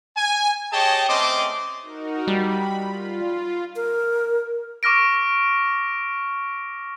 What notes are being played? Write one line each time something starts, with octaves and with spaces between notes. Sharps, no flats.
G#5
G4 G#4 C#5 D#5 G5 A5
A3 C4 C#4 C5 D#5 D6
D#4 F#4 A#4
G3 B5
F4
A#4
C#6 D6 F6 A#6 D7